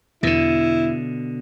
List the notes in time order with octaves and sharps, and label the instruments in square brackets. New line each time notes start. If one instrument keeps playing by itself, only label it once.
[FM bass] E2 [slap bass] B2 D3 [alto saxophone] E4